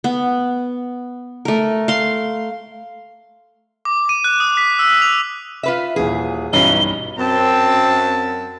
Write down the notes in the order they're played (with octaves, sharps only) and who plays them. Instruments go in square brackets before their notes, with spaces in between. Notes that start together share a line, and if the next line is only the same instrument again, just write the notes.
[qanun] B3
A3 A#4
F5 C6
[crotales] D6
D#7
F#6
D#6
B6
E6
F7
[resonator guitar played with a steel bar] F4 B4 E5
[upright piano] D#1 E3 [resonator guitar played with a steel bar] G#4
[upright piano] B1 G2 C7 [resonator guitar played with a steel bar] E3 C#4 D#4 [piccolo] G7
[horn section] F#2 A5 [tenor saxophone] C4